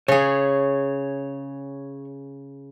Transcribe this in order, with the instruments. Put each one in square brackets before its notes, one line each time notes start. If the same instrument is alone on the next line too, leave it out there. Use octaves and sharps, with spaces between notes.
[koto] C#3 G#4 [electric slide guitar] C#5